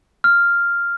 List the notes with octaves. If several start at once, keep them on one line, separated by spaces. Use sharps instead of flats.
F6